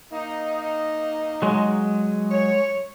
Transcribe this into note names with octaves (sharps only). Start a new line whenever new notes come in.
A#3 D#4
F#3 G#3
C#5